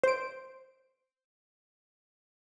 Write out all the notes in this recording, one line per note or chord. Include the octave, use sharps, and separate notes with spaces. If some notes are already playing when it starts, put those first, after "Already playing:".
C5 D7